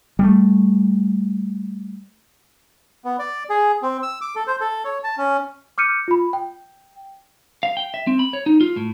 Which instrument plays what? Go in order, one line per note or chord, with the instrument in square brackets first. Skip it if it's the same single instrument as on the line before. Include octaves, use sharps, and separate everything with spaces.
[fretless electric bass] G3 A3
[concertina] B3
D5
G#4
C4
E6
D6
A4
C5
A4
C#5
A5
C#4
[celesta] D6 F6 G6 C#7 D#7
F4 B5
G5
[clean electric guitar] F5
G5
E5
C4
B5
C#5
D#4
F4
A2